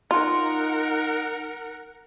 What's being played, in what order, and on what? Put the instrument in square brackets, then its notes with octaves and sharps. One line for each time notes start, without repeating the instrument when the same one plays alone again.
[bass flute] D#4 [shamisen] F4 [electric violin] A#4 F#5